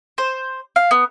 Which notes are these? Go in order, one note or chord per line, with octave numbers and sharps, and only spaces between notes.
C5
F5
B3